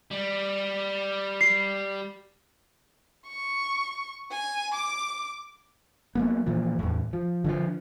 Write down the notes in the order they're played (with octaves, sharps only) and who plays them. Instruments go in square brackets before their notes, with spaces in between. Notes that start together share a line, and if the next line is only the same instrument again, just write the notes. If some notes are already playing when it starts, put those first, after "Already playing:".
[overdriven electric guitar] G3
[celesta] C7
[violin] C#6
G#5
D6
[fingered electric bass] F#3 A#3 B3
A#2 E3 F3
E2 A2
F3
D3 E3 F3